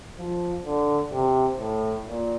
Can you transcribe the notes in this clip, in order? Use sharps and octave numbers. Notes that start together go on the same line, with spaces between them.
F3
D3
C3
A2
A#2